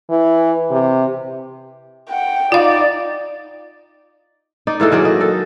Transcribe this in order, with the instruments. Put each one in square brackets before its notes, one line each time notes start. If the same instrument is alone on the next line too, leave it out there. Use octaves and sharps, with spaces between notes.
[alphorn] E3
C3
[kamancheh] F#5 G5
[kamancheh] D#4 [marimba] F4 F5 [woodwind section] D5
[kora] D#4 D5
G#2 E3 A#3 A4
D#3 F#3 G#4 D5
D#5
A4